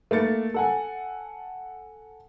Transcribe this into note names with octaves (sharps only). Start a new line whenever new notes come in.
A3 A#3 A6 C#7
A4 F#5 G#5